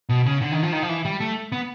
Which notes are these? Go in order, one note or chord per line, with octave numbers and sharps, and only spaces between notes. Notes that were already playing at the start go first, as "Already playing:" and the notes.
B2
C#3
D3
D#3
F3
D#3
F3
E3
G3
A3
B3